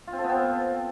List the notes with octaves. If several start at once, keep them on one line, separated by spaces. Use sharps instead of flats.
F4
C4
A4
B3
C4